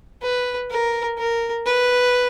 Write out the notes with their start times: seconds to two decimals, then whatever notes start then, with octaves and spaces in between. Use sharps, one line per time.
0.22 B4
0.70 A#4
1.18 A#4
1.66 B4